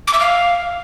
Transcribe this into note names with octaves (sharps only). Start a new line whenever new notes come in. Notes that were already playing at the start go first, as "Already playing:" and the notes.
D6
E5
F5